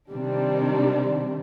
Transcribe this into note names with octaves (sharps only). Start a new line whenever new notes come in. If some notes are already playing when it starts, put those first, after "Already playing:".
C3 D#3 G3 C4 D4